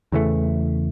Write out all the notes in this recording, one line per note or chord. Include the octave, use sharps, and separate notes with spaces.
E2 C#3 E3 A3